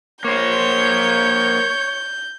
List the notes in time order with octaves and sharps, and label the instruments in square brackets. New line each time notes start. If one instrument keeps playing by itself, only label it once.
[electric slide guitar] A#3 C5 [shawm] C#5 [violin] G6